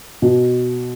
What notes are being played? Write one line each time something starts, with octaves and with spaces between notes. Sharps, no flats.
B2